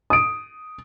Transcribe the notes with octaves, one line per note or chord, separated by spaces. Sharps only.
D#6 D7